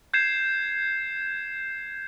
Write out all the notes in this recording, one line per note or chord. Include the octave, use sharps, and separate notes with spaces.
G6 G#6 C7 E7